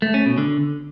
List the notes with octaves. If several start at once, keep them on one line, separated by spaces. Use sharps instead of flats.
A3
C#4
B2
D3